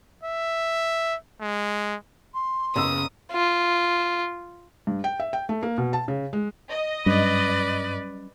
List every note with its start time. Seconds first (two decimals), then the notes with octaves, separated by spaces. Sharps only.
0.23 E5
1.41 G#3
2.34 C6
2.76 F#1 C#3 B3 D#6 E6
3.32 F4
4.87 G2
5.04 G5
5.20 E5
5.33 G5
5.49 A3
5.63 A#3
5.78 B2
5.93 A5
6.08 C#3
6.33 G#3
6.70 D#5
7.06 G2 F#3 G3 C#4 B4 D5